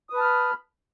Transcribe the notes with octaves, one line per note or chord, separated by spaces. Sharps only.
B4 A5 B5 D#6 F6